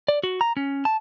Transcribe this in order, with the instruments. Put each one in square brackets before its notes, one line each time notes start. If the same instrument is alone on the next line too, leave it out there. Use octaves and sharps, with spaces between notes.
[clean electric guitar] D5
F#4
A#5
C#4
A5